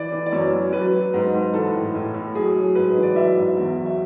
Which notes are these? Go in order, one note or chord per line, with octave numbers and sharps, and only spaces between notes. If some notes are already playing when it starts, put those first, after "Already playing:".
Already playing: E3 D5
E3
D5
F#2 C#5
F#3
F#3 B4
F#3
G#2
G#2
E3 A4
A2
A2
A2
F#3 G#4
F#3
G#2 B4
E3
D5
F#3 E5
G#2
E2
F#3
E5